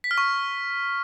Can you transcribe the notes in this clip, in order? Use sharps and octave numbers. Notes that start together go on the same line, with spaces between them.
B6
F6
C#6